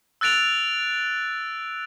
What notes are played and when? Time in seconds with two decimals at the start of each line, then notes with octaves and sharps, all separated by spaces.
0.21 E6 F#6 A6 D7 F7